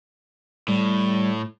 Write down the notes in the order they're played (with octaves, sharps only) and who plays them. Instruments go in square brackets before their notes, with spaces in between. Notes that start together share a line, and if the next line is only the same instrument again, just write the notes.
[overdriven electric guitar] A2 [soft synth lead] G3